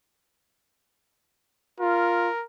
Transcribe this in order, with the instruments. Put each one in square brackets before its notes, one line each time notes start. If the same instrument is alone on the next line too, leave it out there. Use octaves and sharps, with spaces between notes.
[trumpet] F4 [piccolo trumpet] A#4